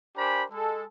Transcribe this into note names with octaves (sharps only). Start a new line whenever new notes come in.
D4 G4 A#4 C5 G#5 B5
G#3 A4